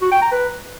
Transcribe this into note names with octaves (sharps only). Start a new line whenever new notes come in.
F#4
G5
A#5
B4